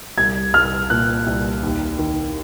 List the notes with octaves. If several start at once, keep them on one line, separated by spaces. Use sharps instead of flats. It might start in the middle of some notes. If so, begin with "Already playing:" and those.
C2 G#6
C2 F6
A#2 F#6
C2
D#2
D#3